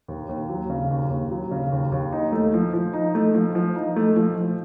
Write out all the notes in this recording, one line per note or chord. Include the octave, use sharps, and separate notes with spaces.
D#2
D#2
F#3
C#3
D#2
D#2
F#3
C#3
D#2
D#2
D#4
A3
F3
F3
D#4
A3
F3
F3
D#4
A3
F3
F3